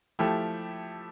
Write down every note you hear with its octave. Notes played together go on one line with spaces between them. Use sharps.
F3 A3 E4 G4